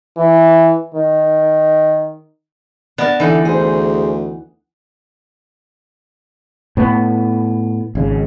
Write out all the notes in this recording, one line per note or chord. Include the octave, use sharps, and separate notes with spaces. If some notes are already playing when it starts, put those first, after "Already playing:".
E3
D#3
B3 D4 A#4 A5
D3 E3 D#4 E4 A4
D2 G#4 C5
A2 B3
G#1 C#3